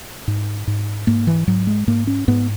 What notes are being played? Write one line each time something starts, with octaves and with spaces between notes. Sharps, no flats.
G#2
G#2
G#2 A#3
E3
G#2 F#3
G#3
G#2 A#3
C#4
G#2 B3